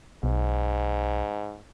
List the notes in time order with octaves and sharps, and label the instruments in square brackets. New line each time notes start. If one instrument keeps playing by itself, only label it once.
[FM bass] B1 [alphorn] G#2